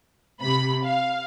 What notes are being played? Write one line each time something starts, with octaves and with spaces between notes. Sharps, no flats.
C3 B5
F5